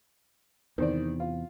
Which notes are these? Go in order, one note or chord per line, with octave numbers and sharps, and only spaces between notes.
E2 C3 D#3 C5 D5
F4